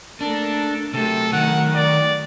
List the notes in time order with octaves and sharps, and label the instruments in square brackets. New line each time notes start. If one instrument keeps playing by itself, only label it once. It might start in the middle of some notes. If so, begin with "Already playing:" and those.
[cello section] A3 A#3 A#4 [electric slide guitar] D4 [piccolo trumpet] A4
[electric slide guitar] C3 [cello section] F#3 A3 A#4 [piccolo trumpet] A4
[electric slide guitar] D#3 [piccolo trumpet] F#5
[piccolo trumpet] D5